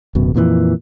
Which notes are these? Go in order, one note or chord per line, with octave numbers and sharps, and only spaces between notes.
D1 F#2 B2
F2 A#2 C#3 E3